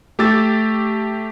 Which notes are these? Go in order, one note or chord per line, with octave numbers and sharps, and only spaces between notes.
A3 G4 D6 E6 A6